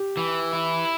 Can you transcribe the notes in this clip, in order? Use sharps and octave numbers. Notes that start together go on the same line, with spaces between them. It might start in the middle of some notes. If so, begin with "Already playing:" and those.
Already playing: G4
E3
E4